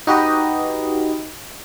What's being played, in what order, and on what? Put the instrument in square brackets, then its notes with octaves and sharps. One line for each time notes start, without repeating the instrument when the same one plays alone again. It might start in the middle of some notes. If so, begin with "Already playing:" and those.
[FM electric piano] D#4 F#4 G4 B4 D#5